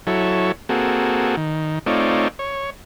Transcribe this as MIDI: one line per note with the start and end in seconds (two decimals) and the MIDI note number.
0.07 0.52 54
0.07 0.52 64
0.07 0.52 69
0.07 0.52 73
0.69 1.36 58
0.69 1.36 60
0.69 1.36 66
0.69 1.36 68
0.69 1.36 69
1.37 1.79 51
1.86 2.28 57
1.86 2.28 60
1.86 2.28 63
1.86 2.28 65
1.86 2.28 73
1.86 2.28 74
2.39 2.70 73